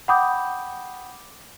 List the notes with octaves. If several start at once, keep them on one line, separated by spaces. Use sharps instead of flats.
F#5 G5 B5 D6 D#6 G6